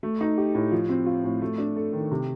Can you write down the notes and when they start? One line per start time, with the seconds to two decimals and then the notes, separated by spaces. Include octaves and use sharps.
0.03 A3
0.21 D#4
0.38 G4
0.55 A2
0.72 F3
0.89 C4
1.06 F4
1.24 A2
1.42 A3
1.58 D4
1.76 A4
1.93 D#3
2.11 C3